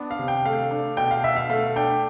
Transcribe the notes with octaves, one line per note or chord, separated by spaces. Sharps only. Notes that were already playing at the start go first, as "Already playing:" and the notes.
Already playing: B3 D4
F5
C3
G5
A3 F5
D4
B2 G5
F5
B2 E5
F5
A3 F5
D4 G5